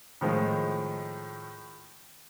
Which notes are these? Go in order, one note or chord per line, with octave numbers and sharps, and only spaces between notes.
A2 D#3 F3 G#3